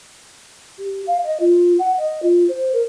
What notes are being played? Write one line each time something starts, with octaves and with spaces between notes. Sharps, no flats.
G4
F5
D#5
F4
F#5
D#5
F4
C5
A#4